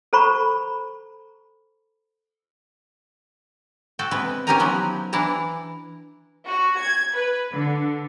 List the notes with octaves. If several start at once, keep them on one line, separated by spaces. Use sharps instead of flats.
A4 C5 A#5 B5 C#6
F#4 A4 G5
C3 G#3 B3 B4
C#4 D#4 G4 A#4 G#5 A#5
F3 F#3 B3
E3 D4 E4 A5 A#5
F#4
G#6
B4
D3